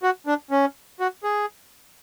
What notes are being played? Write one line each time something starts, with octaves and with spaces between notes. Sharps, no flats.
F#4
D4
C#4
F#4
G#4